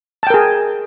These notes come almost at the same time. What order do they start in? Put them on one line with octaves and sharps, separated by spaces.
A5 G5 A#4 G#4